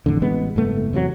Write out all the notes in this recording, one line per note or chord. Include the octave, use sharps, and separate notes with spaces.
A1 F2 D3
A1 G#3 B3
F#1 G#2 A3 B3
E2 C3 E3 F#3